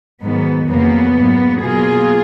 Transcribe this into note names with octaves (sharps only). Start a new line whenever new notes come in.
G#2 D#3 F#3 B3
F2 C#3 F#3 A#3 B3
G#2 F#3 A#3
B2 F#3 A#3 F4 G#4